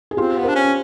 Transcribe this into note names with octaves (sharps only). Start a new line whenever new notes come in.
G#4
C4 F4 G4
B3
D4 A#4 C5
C#4